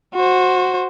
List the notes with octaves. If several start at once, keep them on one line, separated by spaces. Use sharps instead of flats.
F#4 C5